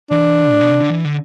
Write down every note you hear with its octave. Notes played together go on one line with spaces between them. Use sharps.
E3 D4
A2
B2
C3
D3
E3
D3